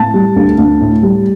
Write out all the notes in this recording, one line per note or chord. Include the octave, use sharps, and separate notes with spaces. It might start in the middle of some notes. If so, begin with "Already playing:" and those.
Already playing: A2 A5
G3
D2
D2
A2
G3